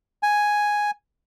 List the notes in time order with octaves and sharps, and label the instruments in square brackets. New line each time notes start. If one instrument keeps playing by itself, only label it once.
[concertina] G#5